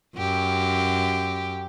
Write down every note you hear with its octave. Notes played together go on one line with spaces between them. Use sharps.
F#2 G4